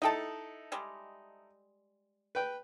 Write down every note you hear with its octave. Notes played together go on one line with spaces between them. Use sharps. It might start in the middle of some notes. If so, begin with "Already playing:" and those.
D#4 E4 A4 D#5 G5 A5
G3 G#3
B4 G5